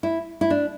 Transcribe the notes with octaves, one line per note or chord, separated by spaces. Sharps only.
E4
E4
D4